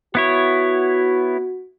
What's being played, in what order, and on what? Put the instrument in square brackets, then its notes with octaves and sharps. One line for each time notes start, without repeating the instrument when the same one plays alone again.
[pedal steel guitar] B3 E4 C#5 [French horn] F#4